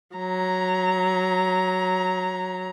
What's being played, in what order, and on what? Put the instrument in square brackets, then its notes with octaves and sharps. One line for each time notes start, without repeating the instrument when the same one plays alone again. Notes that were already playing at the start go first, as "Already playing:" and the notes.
[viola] F#3 A#5